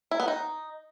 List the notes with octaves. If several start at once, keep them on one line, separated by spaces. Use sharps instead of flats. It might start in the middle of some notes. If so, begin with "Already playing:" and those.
E4
B3
D#4